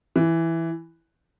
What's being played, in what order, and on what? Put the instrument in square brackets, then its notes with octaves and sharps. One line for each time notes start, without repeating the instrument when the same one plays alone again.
[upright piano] E3